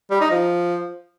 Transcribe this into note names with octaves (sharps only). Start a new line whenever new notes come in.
G3
D#4
F3